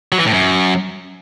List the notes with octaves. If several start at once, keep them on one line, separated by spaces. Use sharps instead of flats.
F#3
E3
A2
F#2